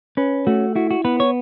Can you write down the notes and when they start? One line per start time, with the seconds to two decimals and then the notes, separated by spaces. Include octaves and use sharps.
0.17 C#4 B4
0.47 A3 F#4
0.75 E4 F#4
0.91 F#4
1.05 B3 B4
1.20 C#5